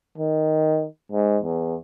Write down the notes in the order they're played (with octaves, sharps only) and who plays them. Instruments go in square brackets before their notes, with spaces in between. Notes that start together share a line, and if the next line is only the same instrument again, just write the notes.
[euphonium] D#3
G#2
E2